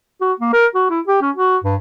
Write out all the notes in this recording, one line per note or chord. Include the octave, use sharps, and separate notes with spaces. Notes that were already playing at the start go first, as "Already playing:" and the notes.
F#4
A#3
A#4
F#4
E4
G4
C#4
F#4
G2